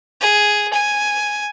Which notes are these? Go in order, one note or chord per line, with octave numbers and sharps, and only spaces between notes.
G#4
G#5